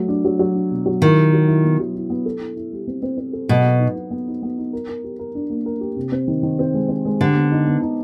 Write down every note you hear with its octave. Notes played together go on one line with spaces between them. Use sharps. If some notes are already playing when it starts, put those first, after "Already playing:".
Already playing: F#3 A3
D4
F#3
F#3
D4
B2
F#3
D#3 E4
G4
F#3
E4
B3
F#3
E4
B3
A4
E4
E4
G3
C4
C4
C4
A4
B2 F#3
B3
D#4
D#4
B3
D#4
B3
D#4
A#4
A#4
G4
A#4
D4
A#3
A#4
G4
C3
C4
D#3
D#3
C4
G#3
C4
G#3
D3 G4
B3
D#4
B3
D#4